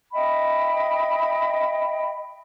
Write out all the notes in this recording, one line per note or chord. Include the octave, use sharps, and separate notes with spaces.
D#5 E5 G5 B5